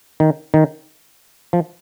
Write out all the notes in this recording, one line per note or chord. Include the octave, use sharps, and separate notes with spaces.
D#3
D#3
F3